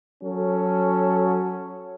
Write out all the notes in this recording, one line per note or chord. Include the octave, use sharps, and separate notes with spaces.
F#3 C#4 A4